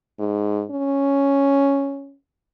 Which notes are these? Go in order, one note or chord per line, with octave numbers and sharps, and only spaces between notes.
G#2
C#4